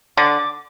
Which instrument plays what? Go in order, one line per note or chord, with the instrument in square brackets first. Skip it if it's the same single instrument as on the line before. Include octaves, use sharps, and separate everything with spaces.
[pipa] D3 [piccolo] D6